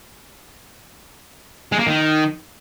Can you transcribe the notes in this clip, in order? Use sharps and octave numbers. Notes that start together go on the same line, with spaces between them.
G#3
A#3
D#3